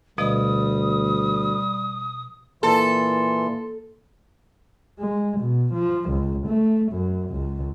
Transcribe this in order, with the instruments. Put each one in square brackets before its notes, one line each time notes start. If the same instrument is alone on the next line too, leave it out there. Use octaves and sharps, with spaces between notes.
[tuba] D2 [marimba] B2 F3 D#5 [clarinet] G3 [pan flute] D#6
[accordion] A#2 E3 C6 [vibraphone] A#3 [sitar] A4
[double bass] G#3
B2
F3
C#2
A3
F#2
C#2